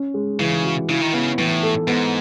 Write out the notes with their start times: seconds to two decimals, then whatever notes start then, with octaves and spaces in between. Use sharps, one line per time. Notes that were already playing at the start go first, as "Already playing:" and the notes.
Already playing: C#4
0.14 G#3
0.40 C#3 E3
0.64 F#4
0.89 C#3 E4
1.01 D#3
1.13 C#3 B3
1.38 A2 E3
1.63 A4
1.87 G#2 B3